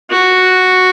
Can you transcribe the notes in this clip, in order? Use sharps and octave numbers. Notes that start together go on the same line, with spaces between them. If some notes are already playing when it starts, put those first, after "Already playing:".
F#4